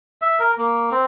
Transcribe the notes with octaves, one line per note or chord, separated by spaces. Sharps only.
E5
A#4
A#3
C4